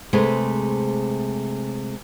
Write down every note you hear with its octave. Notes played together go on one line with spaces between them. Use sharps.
C3 G#3 A3 G#4 B4